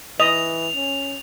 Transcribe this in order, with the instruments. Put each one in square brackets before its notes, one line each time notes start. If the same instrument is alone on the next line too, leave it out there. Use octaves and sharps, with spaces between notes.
[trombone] E3 [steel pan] D#5 [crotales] F7
[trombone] C#4